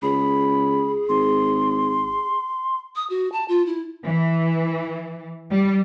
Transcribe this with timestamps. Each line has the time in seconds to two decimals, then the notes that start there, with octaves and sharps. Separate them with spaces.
0.03 C#2 G#4 B5
1.09 G#1 C6
2.96 D#6
3.10 F#4
3.32 A5
3.49 F4
3.66 E4
4.05 E3
5.50 G3